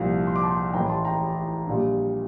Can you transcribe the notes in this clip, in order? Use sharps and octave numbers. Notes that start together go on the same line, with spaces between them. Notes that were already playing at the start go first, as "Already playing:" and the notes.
Already playing: C2 A#2 F3
C6
D6
A5 C6
A1 A2 E3 G5 A#5
A5 C6
G5 A#5
A#1 A#2 G3